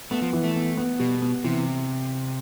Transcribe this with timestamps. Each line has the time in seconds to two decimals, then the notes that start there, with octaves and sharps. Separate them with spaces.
0.11 A3 B3
0.22 F3
0.33 E3
0.44 A3
0.56 B3
0.77 B3
0.99 B2 G3
1.22 B3
1.44 C3 E3